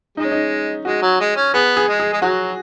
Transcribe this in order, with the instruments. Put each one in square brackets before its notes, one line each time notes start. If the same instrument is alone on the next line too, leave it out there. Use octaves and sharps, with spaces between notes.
[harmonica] G#3 [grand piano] D#4
[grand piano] C#4
D#4
[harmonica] G#3 [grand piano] F#4
[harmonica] F#3
G#3
C#4
[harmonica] B3 [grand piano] G#4
[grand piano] G#4
[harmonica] G#3
[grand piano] G#4
[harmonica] G#3
[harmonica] F#3 [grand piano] F#4